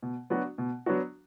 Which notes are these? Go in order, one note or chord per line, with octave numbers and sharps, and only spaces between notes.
B2
F#3 B3 D4 F#4
B2
F#3 B3 D4 F#4